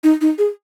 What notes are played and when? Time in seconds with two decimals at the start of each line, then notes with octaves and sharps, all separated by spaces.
0.04 D#4
0.21 D#4
0.38 G#4